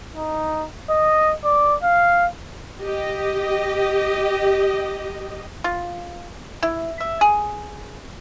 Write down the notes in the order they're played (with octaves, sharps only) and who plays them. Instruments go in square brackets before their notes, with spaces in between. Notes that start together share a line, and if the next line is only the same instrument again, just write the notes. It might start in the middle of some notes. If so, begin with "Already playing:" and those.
[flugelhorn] D#4
D#5
D5
F5
[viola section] G4 D#5
[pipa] F4
E4
E5
G#4